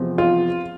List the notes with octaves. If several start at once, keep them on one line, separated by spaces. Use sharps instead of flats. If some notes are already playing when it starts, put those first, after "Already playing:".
Already playing: E2 C3 F3 G#3 C4
F4